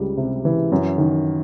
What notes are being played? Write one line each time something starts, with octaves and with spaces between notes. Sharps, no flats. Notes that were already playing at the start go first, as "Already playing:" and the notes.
Already playing: C#2 G3
C3
E3
F#2
D#3